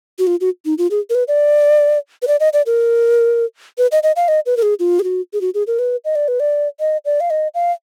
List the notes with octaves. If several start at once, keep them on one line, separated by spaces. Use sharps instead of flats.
F#4
F4
F#4
D#4
F4
G#4
A#4
B4
D5
B4
D5
D#5
D5
A#4
B4
D#5
D#5
F5
D#5
B4
A#4
G#4
F4
G#4
F#4
G#4
F#4
G#4
A#4
B4
D#5
D5
B4
D5
D#5
D5
F5
D#5
F5